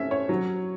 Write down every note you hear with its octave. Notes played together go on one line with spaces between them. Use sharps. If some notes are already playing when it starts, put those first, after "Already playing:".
Already playing: A3 C#4 E5
C#5
F#3